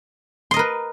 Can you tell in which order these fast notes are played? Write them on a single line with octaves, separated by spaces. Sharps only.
C6 D#5 A#4 B4